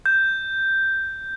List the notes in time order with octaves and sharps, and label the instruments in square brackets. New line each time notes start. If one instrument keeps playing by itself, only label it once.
[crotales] G6